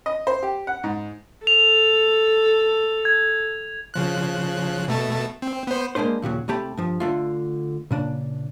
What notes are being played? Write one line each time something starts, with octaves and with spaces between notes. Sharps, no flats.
D#5
C5
G4
F#5
G#2
A4 F7
G#6
C#3 F3 F#6
B2 A3 A5
C4
B3 C5
G#3 A#3 D4 B4 C5
D#2 A#2 C#3 F#3
C2 C3 A3 G4 A5 B5
G2 F3
D3 A3 F4
A#2 C#3 D4